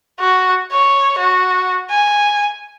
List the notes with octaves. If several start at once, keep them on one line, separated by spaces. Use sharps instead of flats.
F#4
C#5
F#4
G#5